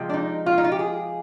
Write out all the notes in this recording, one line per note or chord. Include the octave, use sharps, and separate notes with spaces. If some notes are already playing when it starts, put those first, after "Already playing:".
Already playing: C3 F3 G#3
D4
D#4
F4
D#4
F4
G4
G#4